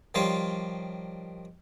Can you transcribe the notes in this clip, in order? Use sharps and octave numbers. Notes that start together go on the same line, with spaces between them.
D#3 F3 G3 F4 C#5 C6